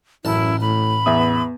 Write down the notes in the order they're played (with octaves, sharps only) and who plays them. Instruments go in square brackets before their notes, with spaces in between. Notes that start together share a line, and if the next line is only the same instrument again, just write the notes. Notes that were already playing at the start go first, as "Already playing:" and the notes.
[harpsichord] A1 A5 [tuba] F#2 [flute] E4
[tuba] A2 [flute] B5
[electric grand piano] E2 E5 D#6 [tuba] B3